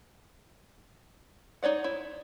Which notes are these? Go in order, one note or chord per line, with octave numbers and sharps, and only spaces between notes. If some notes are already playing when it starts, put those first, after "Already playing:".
D#4 C#5 D5 F#5
E4